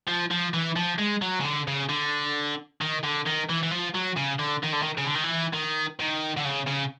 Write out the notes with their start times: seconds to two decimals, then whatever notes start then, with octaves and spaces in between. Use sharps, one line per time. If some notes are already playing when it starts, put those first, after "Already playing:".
0.07 F3
0.31 F3
0.54 E3
0.76 F3
0.99 G#3
1.22 F#3
1.40 C#3
1.45 D3
1.67 C#3
1.89 D3
2.81 D#3
3.03 D3
3.26 D#3
3.49 E3
3.63 E3
3.71 F3
3.95 F#3
4.17 C#3
4.39 D3
4.63 D#3
4.72 D3
4.82 D#3
4.98 C#3
5.06 D3
5.15 D#3
5.24 E3
5.54 D#3
6.00 D#3
6.37 D3
6.45 C#3
6.67 C#3